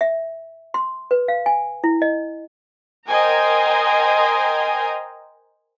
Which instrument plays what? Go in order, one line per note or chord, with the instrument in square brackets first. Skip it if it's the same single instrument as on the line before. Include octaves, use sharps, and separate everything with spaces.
[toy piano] E5
C6
B4
F5
G#5
E4
D#5
[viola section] A#4 C5 D#5 G5 G#5 A#5